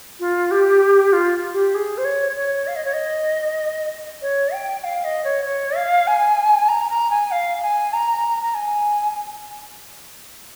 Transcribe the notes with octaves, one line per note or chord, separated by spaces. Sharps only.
F4
G4
F4
G4
G#4
C5
C#5
C#5
F5
D#5
C#5
D#5
C#5
G5
F5
D#5
C#5
C#5
F5
G#5
A#5
A#5
G#5
F5
G#5
A#5
A#5
G#5